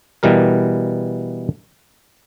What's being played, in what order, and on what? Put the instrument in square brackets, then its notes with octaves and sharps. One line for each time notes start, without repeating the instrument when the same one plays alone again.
[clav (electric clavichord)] B2 E3 G3 A#4